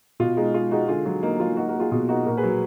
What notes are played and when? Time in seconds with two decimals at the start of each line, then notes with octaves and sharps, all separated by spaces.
0.20 B2 F4
0.37 G#3 D#4
0.54 G#3 F4
0.71 G#3 D#4 F#4
0.88 D3 F4 G#4
1.05 F#3 F4
1.23 A#3 D#4
1.40 F#3 F4
1.57 A#3 D#4 F#4
1.69 F#4 A#4
1.74 A#3
1.80 F4 G#4
1.91 B2 F4
2.08 A#3 D#4 F#4
2.26 A#2 F#4 A#4
2.37 G#4 B4
2.43 F#3